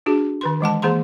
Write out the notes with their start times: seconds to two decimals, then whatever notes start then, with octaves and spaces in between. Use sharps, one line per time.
0.06 D4 F#4 G#4
0.41 D#3 B4 C6
0.61 E3 G#3 F#5 A5
0.82 E3 A#3 G#4 A#5 C6